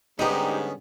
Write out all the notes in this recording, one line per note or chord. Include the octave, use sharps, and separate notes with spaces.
G#2 D3 G3 G#3 B3 C#4 D#4 G4